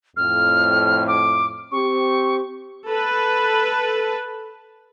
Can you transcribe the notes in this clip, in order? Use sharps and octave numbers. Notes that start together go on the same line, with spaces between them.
F2 A2 F6
D6
C4 G4 C#6
A4 B4